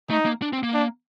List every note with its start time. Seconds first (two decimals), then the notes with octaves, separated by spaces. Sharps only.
0.10 A3 D#4
0.26 A#3
0.42 D4
0.53 C4
0.63 A#3
0.74 D4